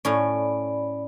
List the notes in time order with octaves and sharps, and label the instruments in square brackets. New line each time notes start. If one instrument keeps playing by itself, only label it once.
[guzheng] A2 C#4 [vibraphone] D5 B5